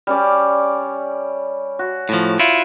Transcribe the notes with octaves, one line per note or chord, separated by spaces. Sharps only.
G3 C#4 D5
F#4
A2 F3
E4 F4